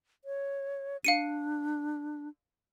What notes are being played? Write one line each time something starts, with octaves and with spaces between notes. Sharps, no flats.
C#5
D4 F5 C#7 D#7